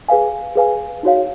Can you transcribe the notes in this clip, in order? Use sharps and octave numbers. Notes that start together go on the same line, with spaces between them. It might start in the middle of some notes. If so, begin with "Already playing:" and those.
G#4 B4 F5 G#5
G#4 B4 F5 G#5
D#4 F#4 C#5 F5